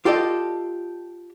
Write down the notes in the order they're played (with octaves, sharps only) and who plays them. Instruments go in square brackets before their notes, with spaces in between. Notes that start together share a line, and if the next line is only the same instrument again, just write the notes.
[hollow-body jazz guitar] F4 G4 A4 D5 D#5